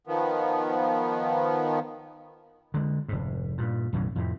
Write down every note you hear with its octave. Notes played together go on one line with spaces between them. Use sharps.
D#3 F3 B3
D3 G#3
F1 G#2
G2 A#2
B1 F#2 A2 D3
F2 A2 C3